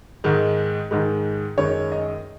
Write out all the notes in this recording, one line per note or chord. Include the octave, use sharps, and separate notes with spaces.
G#2 D#3 G#3
G#2 D#3 G#3
F#2 D#3 G#3 C#5
D#5